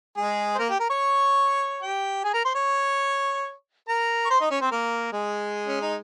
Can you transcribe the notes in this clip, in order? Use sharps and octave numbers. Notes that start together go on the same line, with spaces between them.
G#3 G#4
C5
A#3 A#4
G4 G5
A#4 A#5
C#5 C#6
G4 G5
G#4 G#5
A#4 A#5
C5 C6
C#5 C#6
A#4 A#5
C#6
C5 C6
D#4 D#5
C#4 C#5
C4 C5
A#3 A#4
G#3 G#4
C#4
D#4